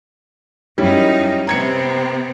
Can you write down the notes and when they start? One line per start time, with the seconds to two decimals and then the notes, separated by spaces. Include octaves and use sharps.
0.78 F#2 G3 C#4 D#4 E4
1.47 C3 B3 C4 A#5 G#6 C#7